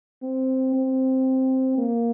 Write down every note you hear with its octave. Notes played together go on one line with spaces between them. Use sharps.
C4
C4
A#3